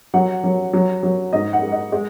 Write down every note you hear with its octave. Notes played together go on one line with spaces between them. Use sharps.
F#3 F#5
F#3
F#3
F#3
G#2 D#5
F#5
G#3
D#5
G#3